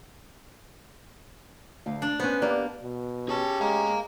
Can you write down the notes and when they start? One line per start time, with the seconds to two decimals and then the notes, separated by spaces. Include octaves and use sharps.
1.86 D2 F5
2.02 D4
2.20 B3 C#4 C5
2.42 A#3 B3 G4 D5
2.82 B2
3.29 C#4 G4 G#4 A5
3.61 G#3 F5 A#5